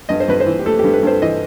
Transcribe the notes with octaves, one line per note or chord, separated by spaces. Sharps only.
G2 D#5
C5
G2 B4
C5
E3
G4
A3 A4
G4
G2
B4
G2 C5
E3 D#5